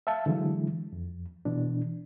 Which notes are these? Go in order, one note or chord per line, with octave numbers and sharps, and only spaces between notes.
E5 F5 A5
D3 E3 F#3 G#3 E4
F2
B2 E3 D4